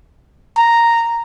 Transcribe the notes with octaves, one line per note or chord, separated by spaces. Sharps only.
A#5